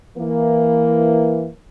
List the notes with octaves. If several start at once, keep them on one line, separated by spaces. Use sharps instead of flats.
E3 A#3